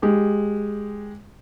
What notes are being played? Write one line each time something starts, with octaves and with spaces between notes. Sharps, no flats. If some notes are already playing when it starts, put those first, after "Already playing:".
G#3 G4